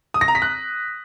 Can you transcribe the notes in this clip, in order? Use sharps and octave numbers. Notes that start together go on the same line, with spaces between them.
D#6
A#6
A#5
B6
F#6